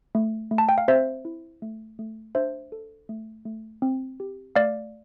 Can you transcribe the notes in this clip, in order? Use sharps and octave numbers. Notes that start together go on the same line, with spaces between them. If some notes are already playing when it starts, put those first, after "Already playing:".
A3
A3
A5
G5
F5
C4 C5 E5
E4
A3
A3
D4 C5 E5
A4
A3
A3
C4
G4
A3 D5 F5